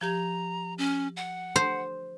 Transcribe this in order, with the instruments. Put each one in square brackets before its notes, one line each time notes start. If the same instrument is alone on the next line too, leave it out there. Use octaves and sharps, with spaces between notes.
[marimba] F3 G4 G#6 [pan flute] A#5
[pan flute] C#4
F#5
[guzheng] C5